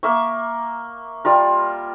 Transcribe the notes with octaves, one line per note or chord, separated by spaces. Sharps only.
A#3 E5 C#6
G3 F4 A#4